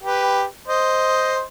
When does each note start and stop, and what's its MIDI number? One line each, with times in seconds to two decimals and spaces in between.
0.04 0.44 67
0.04 0.44 71
0.68 1.42 72
0.68 1.42 75